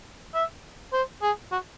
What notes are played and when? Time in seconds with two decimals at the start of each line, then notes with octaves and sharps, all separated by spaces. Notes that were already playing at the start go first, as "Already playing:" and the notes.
0.35 E5
0.93 C5
1.22 G#4
1.52 F#4